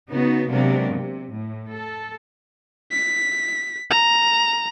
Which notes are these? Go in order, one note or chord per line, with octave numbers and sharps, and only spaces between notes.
C#3 B3 D#4 F#4
C3 F#3 G#3 A#3 B3 D4
C3
A2
A4
B6
A#5